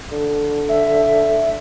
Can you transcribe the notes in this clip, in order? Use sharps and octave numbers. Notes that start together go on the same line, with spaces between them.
D3
E5